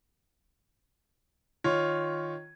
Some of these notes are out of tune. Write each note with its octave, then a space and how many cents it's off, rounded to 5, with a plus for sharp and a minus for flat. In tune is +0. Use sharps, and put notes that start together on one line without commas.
D#3 +0 F4 +0 C#5 +0